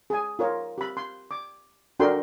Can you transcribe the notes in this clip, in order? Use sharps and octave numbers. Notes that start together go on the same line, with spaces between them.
G#4 G#5
F4 A#4 C#5
G4 B5
C6
D6
D4 F#4 A4 A#4 G5 C6